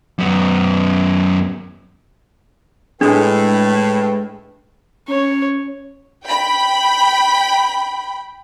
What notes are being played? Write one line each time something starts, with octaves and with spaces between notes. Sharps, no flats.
F#2 B3
A2 G#3 D4 G#4 B4 G5
C#4 C#5
G5 B5